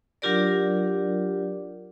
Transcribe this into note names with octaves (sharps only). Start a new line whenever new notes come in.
F#3 D4 F4 G4 A#4 D5